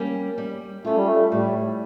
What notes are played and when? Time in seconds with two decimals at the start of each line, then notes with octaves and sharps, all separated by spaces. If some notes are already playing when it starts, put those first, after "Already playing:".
Already playing: G3 A#3 C#4
0.38 G3
0.85 A3 C#4 F4
0.96 G3
1.07 A3
1.32 A2 G3